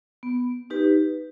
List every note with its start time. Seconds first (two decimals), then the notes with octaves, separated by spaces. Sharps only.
0.23 B3
0.70 D#4 G4 B4